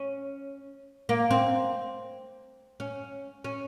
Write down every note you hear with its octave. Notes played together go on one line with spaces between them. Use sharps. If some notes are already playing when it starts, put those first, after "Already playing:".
Already playing: C#4
A#3
C4
C#4
C#4